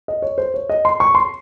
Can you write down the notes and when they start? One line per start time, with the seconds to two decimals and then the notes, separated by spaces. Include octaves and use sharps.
0.08 D#5
0.22 C#5
0.38 C5
0.54 C#5
0.69 D#5
0.85 C6
1.00 C#6
1.15 C6